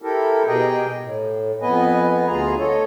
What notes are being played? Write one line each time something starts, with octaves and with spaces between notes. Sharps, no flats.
E4 G4 A4 A#4
B2 G4 G#4 A#4 D#5 G5
A2
F2 B3 B4 D#5 G#5
D2 B3 F4 G#4 G#5 A#5
A4 C#5 D#5